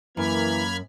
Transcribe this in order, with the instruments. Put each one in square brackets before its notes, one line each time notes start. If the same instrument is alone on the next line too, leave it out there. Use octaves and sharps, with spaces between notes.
[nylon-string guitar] F#2 [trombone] E3 [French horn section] A#3 [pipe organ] B5 F6 G#6